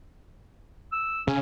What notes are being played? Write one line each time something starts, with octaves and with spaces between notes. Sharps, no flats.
E6
C#3 C#4